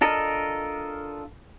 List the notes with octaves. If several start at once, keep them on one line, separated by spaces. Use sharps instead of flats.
D4 F4 A4 A#4 D#5